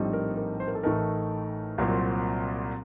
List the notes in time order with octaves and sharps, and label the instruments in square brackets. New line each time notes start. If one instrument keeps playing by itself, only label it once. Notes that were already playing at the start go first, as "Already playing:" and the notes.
Already playing: [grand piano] A#1 A2 G3 C4 D#4
A#4
A#4
C5
A#4
A4
A1 A2 A3 D#4 A#4
C2 A#2 F#3 C4